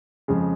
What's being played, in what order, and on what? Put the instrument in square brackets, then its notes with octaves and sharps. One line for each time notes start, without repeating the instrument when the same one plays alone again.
[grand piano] F2 C#3 G#3